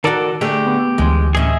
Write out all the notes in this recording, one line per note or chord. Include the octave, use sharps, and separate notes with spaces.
D#3 F#4 A4 A#4 D5
D3 A3 G4 G#4
B3
D2 E3 G#3
A2 C#4 G#4 D#5 E5